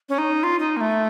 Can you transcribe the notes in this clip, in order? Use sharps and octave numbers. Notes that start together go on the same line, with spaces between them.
C#4
D#4
F4
D#4
A#3
A3